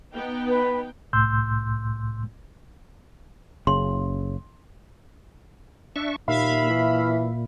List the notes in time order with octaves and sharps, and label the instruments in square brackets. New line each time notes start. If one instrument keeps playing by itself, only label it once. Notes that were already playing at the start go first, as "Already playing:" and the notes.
[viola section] B3 D#4 G5
[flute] B4
[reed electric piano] C2 A2 C6 E6 G6
[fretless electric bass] F#1 C#3 [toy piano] C6
[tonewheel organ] D4 E5 C#6
[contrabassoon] D#2 [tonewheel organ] A#2 [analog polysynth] E5 F5 B5
[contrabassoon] E3